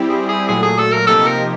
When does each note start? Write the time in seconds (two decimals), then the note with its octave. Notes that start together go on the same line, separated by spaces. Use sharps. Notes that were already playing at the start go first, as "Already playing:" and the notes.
Already playing: G3 C4 E4 G4
0.09 G#4
0.29 G#4
0.49 A#2 F#3 A3 G#4
0.63 G#4
0.78 A4
0.92 A#4
1.07 C3 F3 A#3 D#4 G4 A4
1.26 A#4